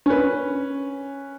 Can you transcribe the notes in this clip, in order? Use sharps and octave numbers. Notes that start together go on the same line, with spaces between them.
C#4 B4